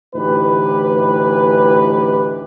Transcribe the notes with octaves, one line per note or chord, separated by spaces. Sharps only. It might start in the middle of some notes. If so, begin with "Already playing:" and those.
D2 A2 E3 D#4 G4 B4